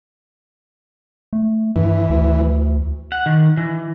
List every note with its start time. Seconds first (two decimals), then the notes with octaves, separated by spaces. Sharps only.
1.33 A3
1.76 G2 E3
2.10 D2
3.12 F#5
3.26 D#3
3.57 E3